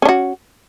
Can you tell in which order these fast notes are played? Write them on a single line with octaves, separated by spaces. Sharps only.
C#4 D4 F#4